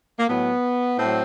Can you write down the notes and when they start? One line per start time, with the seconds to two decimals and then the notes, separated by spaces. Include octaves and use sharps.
0.19 A#3
0.28 A2 F#3 B3
0.99 A2 F#3 C4